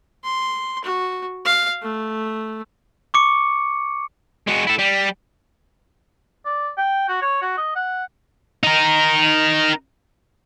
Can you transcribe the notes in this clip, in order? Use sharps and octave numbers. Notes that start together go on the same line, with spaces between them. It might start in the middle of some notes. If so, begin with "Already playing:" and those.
C6
F#4
F5
A3
C#6 D6 C#7
G#3 F#4
E4 A4
G3
D5
G5
F#4
C#5
F#4
D#5
F#5
D#4 A#4